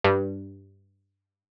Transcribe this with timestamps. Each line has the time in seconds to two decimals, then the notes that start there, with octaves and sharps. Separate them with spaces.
0.04 G2